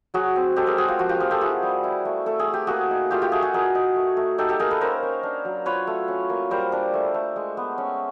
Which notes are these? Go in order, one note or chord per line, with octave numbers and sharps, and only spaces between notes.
F#3 F#4 G#4
C4
G#3 G4 A4
G#4 A#4
G#3 F#4 G#4
F4 G4
F3 F#4
F4 G4
F3 G#4 A#4
G4 A4
E4 F#4 G#4
G3
E4
A3
A3 A4
G#4
A3
G4
A#3 F#4 G#4
D#4
A3 F4 G4
F4 G4
A3 F#4 G#4
F#4 G#4
D#4 G#4 A#4
D#4
A3
A3
D#4 G4 A4
G4 A4
A#3 G#4 A#4
A4 B4
C#4 A#4 C5
C#4
D4
F#3
F4 B4 C#5
A3
C#4
A#3
G3 A#4 C5
D4
A3
A3
G#3
B3
C#4